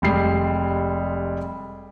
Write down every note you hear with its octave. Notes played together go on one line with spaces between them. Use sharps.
F1 G3 G#3 C7